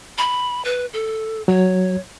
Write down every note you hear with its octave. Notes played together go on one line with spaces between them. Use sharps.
B5
B4
A4
F#3 C#5